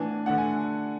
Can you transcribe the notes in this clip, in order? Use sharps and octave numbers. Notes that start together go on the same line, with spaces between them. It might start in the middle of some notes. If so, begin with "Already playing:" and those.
Already playing: A2 E3 B3 D4 G#5
D3 A3 D4 F#5
G#5